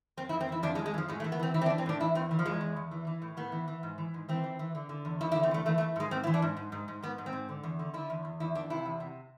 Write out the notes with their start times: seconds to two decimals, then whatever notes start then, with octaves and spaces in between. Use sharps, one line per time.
0.17 F2 C4
0.29 E4
0.33 F2
0.40 C4
0.49 E3 E4
0.63 F2 D4
0.75 G#3
0.79 F2
0.86 G#3
0.94 E3
0.98 F3
1.08 A2 G#3
1.20 A3
1.24 E3
1.32 B3
1.39 E3 C4
1.54 E3 E4
1.61 C4
1.66 D4
1.70 E3
1.78 C4
1.86 A2 D4
2.00 E3 E4
2.15 E2 C4
2.31 E3
2.39 F3
2.45 E2 G#3
2.61 E2
2.76 E2
2.91 E3
3.07 E3
3.22 A2
3.37 A2 B3
3.52 E3
3.68 E3
3.83 G#2
3.98 E3
4.14 G#2
4.29 E3 C4
4.44 E3
4.59 E3
4.75 D3
4.89 D3
5.05 E2
5.21 E2 E4
5.32 E4
5.35 D3
5.43 C4
5.51 E2 A3
5.66 E3 A3
5.78 A3
5.81 E3
5.96 G#2 G#3
6.11 G#2 C4
6.24 E4
6.27 E3
6.34 D4
6.42 G#2
6.57 G#2
6.72 G#2
6.88 G#2
7.02 G#2 B3
7.18 G#2
7.26 C4
7.33 G#2
7.49 D3
7.63 E2
7.79 D3
7.94 D3 E4
8.10 E2
8.25 E2
8.40 E2 E4
8.55 E3 D4
8.70 C3 E4
8.86 E2
9.00 C3